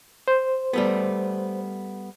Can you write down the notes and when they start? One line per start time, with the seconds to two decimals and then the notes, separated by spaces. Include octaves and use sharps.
0.28 C5
0.73 G3 A3 B3